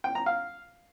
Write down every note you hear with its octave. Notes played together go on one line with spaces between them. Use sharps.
G5
A#5
F5